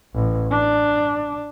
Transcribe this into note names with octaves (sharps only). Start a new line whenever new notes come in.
A1
D4